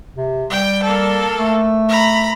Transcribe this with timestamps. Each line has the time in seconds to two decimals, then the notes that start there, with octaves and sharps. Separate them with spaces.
0.16 C3
0.50 G3 G5
0.83 A#3 A4
1.37 A3
1.89 A#5 B5